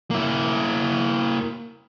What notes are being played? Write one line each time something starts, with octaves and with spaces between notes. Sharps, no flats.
A#3 E4